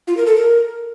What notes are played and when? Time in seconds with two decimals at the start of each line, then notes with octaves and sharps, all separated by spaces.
0.07 F4
0.17 A#4
0.27 A4
0.36 A#4